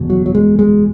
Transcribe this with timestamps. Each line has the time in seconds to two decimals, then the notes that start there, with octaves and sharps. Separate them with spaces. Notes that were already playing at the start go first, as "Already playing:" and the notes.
Already playing: F#1 E2 B2
0.10 F#3
0.26 F#3
0.35 G#3
0.59 G#3